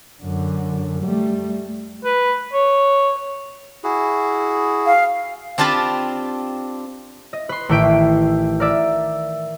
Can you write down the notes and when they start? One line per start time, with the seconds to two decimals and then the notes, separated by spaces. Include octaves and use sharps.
0.22 F#2 D3
1.02 G3 A3
2.04 B4
2.53 C#5
3.84 E4 F#4 G#4
4.86 F5
5.58 C4 D4 F4 G4 A5 B5
7.33 D#5
7.49 B4 C6
7.69 A1 D#3 E5 G5 B6 D7
8.60 A#4 D5 E5